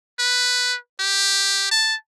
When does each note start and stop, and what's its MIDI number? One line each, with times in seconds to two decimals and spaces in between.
0.19 0.77 71
1.00 1.68 67
1.71 1.95 81